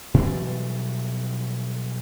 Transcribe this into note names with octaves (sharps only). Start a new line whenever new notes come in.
B2 E3 F#3 G3